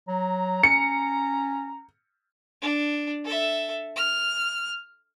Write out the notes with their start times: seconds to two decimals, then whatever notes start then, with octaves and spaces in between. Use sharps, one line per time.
0.08 F#3 A#5
0.63 C#4 C#7
2.61 D4
3.25 A4 E5
3.96 F6